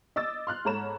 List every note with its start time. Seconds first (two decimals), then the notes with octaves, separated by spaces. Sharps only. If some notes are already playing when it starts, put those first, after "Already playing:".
0.16 D#5 D6 E6 A6
0.47 C6 F6 F#6
0.65 G#2 A4 C#5 A#5 B5 E7